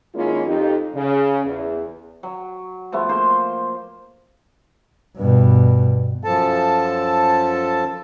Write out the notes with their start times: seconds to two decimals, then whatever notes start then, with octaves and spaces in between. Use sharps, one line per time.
0.14 D#3 G#3 A#3 C#4 E4 F4
0.46 F2 D#4 G4
0.95 C#3
1.45 E2
2.23 F#3
2.92 F3 A3 B3
3.09 A#3 C5 C6
5.17 G2 B2
6.24 F#2 F3 A4 A5